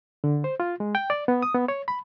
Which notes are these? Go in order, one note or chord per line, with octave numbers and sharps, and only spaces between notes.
D3
C5
F4
G#3
G5
D5
B3
D#6
B3
C#5
B5